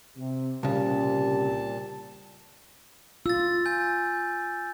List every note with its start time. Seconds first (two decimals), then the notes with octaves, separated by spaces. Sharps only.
0.17 C3
0.63 C2 A#2 C#3 G3 C4 G4 A5
3.26 F4 E6 A6
3.66 G#5 G6